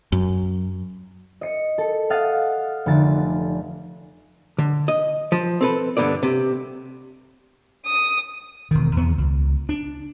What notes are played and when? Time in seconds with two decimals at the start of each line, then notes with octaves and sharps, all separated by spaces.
0.12 F#2
1.41 D#5 C#7
1.78 A4
2.10 F5 F#5 D#6 A6
2.86 F1 D3 A6
4.58 D3
4.88 D#5
5.32 F3
5.61 C4 A4 B4
5.97 G2 B2 D3 B3 D5
6.23 C3
7.85 D#6
8.71 E1 D#3
8.96 E2 B3
9.18 C#2
9.69 D4